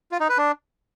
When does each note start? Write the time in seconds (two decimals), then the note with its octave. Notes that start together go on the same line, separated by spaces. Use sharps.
0.11 F4
0.20 D#4
0.29 B4
0.38 D4